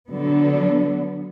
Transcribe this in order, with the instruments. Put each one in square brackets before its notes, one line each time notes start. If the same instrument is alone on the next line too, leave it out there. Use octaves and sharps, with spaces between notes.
[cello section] D3 F#3 B3